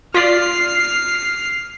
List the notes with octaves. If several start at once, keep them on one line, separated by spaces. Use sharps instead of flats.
F4 D5 F6 C7